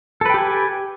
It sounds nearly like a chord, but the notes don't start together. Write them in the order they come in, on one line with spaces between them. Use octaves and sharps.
A4 B4 G5 G4 G#5